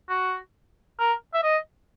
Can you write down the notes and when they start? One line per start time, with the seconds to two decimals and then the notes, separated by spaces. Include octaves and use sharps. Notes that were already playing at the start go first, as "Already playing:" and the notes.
0.09 F#4
0.99 A#4
1.34 E5
1.43 D#5